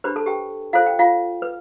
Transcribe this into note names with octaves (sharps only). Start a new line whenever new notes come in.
D4 G4 B4 C5 B5
A4 A5
G4 G5
F4 A4 C5 F5
G5
F4 F5
B4